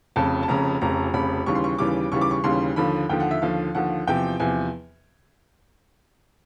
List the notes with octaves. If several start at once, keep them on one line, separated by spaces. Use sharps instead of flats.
F1 F2 C#3 A5
A5
F1 F2 C#3 A#5
F1 F2 C#3 A#5
F1 F2 C#3 B5
D#2 C#3 E3 G3 C#6
C6
C#6
D#2 C#3 E3 G3 D6
D#2 C#3 E3 G3 C#6
D6
C#6
D#2 C#3 E3 G3 C6
D#2 D3 F3 B5
D#2 D3 F3 G5
F#5
E5
D#2 D3 F3 F5
D#2 D3 F3 F#5
E2 C3 F3 G5
E2 C3 F3 G#5